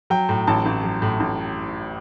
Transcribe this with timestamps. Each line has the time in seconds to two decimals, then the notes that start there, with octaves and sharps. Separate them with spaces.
0.10 F#3 G5
0.29 A2
0.47 A1 A5
0.66 A1
0.84 F#3
1.02 A2
1.20 A1